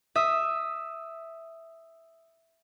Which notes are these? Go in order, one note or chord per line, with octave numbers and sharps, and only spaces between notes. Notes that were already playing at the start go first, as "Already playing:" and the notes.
E5 D#6